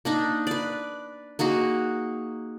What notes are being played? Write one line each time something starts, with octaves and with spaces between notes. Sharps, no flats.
A#3 D4 D#4
B4 D5
A#3 D#4 F#4 G#4